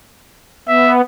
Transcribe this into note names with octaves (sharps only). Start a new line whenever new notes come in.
B3 E5